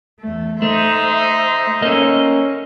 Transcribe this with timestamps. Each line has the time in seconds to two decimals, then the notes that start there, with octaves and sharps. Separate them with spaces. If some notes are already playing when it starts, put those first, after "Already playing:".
0.20 E2 A3
0.62 A3 D#4 C5 E5
1.82 A#3 C#4 A4 D#5